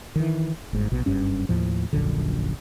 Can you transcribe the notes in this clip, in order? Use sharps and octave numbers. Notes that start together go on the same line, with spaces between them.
D#3 E3
G1 G#2
A#1 B2
F#1 G2 C#4
D#2 A2 F3
D#1 A#1 F#2 D3